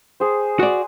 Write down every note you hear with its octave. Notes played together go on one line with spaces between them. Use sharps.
G#4 C5
F#4 D5